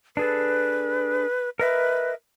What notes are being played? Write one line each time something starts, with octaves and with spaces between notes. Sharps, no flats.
D4 G#4 A4 B4
A#4 B4 D#5 E5